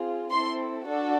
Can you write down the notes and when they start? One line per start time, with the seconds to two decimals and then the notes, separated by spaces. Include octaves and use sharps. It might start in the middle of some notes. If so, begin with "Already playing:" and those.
Already playing: C4 F4 G#4
0.31 C4 E4 A4 C6
0.86 D4 F#4 A4